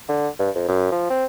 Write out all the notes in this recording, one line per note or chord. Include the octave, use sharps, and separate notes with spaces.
D3
G2
F2
F#2
F3
C4